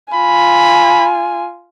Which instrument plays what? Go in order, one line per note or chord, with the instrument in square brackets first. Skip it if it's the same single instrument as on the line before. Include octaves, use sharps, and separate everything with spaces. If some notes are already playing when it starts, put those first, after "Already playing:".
[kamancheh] F4 G#5 [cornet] B5